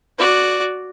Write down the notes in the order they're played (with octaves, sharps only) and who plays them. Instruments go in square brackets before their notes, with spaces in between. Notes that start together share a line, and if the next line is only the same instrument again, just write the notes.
[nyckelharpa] F#4 D5